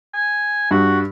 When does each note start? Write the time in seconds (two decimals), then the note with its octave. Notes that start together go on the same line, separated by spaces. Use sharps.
0.14 G#5
0.71 G2 F#4